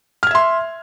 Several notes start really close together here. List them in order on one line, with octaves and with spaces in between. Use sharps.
F6 G#6 E5 C6